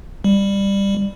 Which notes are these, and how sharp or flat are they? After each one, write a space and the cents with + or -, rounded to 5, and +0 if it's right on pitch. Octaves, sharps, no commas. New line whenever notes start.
G3 +15